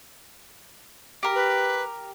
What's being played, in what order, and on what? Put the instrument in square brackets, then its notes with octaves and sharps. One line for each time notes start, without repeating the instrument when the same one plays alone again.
[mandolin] G4 A#4
[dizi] B4